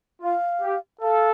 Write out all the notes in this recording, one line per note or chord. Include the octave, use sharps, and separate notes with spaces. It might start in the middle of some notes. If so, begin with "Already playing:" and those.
F4 F5
G4
A4 F5